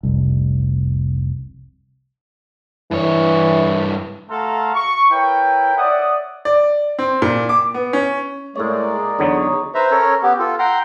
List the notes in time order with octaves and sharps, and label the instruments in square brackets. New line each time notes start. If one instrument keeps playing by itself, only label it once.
[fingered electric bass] F1 C2
[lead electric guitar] G2 C#5 [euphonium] E3
[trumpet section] A3 F#4 A4 F5 A#5 C6
C#6
E4 A#4 B4 C#5 G5
C#5 D5 E5 F#5 D#6
[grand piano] D5
C4
A#2
D6
B3
C#4
[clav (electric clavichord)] A2 C#5 [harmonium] G#3 A#3 D5 [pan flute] G#4
[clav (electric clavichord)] E2 D3 F#3 [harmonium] D#4 C#5
[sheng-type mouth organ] B4 C5 E5 A#5
C#4 A4 A#4 C#5
B3 G4
F4 A4
F#5 G5 A#5 C6